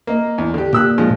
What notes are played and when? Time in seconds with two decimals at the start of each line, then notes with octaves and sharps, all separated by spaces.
0.07 A#3 D#5
0.38 E2
0.54 D3 G4
0.73 A#2 G4 E6 F#6
0.98 F3 G#3